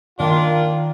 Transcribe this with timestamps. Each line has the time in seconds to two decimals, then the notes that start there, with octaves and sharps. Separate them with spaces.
0.20 D#3 A#3 D4 F4